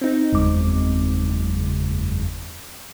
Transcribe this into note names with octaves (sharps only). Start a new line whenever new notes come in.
C4 D#4
F#1 E2 G#3 D6